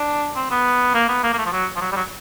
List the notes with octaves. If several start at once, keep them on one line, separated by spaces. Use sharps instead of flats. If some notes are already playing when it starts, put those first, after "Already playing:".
Already playing: D4
C4
B3
A#3
B3
A#3
A#3
A3
F3
F#3
F3
F#3
G3
F#3